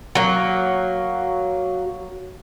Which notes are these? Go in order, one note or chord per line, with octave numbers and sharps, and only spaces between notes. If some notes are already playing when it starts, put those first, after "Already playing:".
F#3 A#3